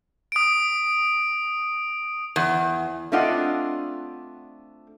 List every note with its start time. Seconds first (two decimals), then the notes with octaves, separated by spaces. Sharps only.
0.32 D#6 D7
2.36 E2
3.12 A3 C4 D4 F4 D#5 F#5